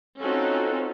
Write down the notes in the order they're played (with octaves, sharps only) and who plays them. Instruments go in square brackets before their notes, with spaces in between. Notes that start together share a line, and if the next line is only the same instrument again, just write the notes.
[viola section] C4 C#4 D#4 F4 F#4 A4